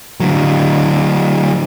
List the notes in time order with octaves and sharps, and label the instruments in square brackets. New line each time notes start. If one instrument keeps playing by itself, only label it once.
[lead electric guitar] D3 F#3